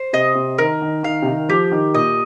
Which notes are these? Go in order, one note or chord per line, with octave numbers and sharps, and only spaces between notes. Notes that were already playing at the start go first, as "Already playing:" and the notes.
Already playing: C5
C3 D#5
C3
D#3 A#4
D#3
D#3 F5
C3
D#3
F3 G4
D#3
A#2 D#5